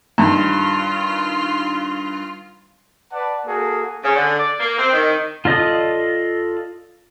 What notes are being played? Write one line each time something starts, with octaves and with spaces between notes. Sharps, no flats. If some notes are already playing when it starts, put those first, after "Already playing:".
G2 D#3 F4
B4 D5 F#5 A5
A#3 F#4 G#4 A4
C#3
D3
D5
A#3
C4
D#3
F4 A4 D5 D#5 D#6